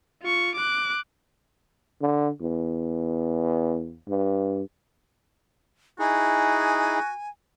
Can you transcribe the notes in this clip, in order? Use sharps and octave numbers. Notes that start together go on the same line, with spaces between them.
F4 C#6
D6 F#6
D3
E2
G2
D#4 E4 F#4 G#4 G#5